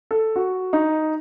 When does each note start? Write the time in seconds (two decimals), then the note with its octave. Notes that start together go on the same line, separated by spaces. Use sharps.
0.11 A4
0.36 F#4
0.73 D#4